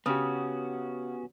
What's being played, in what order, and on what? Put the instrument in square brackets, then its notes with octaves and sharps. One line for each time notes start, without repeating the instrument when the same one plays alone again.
[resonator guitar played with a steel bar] C#3 [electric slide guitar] B3 C#4 F#4 [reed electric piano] G4 D#6